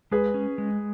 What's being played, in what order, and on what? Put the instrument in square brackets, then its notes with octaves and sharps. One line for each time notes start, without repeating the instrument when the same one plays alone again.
[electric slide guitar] G#3 [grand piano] G#4 B4
[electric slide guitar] C#4
G#3